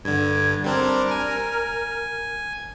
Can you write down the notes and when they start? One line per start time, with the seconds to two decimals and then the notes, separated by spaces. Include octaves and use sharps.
0.05 G2 D3 G#6
0.64 G3 C4 D4 A#4
1.11 G#5